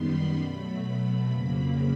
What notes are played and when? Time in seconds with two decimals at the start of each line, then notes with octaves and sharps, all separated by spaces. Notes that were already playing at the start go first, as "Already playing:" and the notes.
Already playing: F#2 D#3 G3 B3 B5 C6
0.36 B2 F#3 A3 B5
0.82 B5
1.28 F2 C#3 F#3 A#3